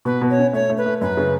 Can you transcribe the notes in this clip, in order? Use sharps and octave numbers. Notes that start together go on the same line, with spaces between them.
B2 B4
B2
C#5
C#4
A3 C#5
A3
B4
A3
F#2 B4
C#3